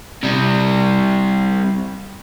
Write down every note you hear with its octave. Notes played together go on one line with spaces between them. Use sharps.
C3 G3